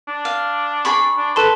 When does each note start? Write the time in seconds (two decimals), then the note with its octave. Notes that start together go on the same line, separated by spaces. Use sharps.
0.08 D4
0.25 F5
0.85 G#4 B5 C#6
1.18 D4
1.36 A4 B4 A5 C6